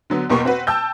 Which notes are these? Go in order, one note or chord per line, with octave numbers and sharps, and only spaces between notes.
D3 F#3 B3
E2 B2 A#3 G4 C6 C#6
C4 F#4 B4
G5 A5 E6 G6